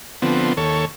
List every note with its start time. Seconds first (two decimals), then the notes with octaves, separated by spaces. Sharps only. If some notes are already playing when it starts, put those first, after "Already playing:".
0.22 D3 F3 B3 C4
0.57 D#2 A4 C#5